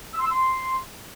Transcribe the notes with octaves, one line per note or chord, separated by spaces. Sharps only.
E6
C6
E6
C6